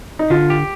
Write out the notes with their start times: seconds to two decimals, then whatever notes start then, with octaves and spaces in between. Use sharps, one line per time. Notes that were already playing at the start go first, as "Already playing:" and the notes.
0.19 D#4
0.30 D3 F4
0.50 G4